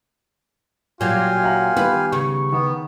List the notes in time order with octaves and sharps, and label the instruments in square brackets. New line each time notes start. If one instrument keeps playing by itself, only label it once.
[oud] A#2 F#3 [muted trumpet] F4 [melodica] G4 F5 G#5
[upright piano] E5 F#5 A#5
[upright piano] D#3 G3 B3 [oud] B4
[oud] C#3 [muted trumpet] C#6
[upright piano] D#3 [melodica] B3